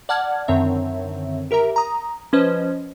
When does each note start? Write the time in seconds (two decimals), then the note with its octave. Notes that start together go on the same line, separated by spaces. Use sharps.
0.09 D5 F#5 A5 F6 G#6
0.48 F#2 D3 D#3 C4 C#5 E5
1.51 G4 A#4 E5 A#5
1.76 A#5 D#6
2.33 F3 C#4 B4 C5 D#5